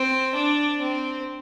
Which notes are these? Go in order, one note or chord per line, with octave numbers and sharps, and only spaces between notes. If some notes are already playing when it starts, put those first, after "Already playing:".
Already playing: C4
D4
C4